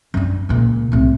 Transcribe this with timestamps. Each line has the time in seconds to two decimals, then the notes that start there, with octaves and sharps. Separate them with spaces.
0.14 F#2 D4
0.49 C#2 A#2
0.92 C2 A2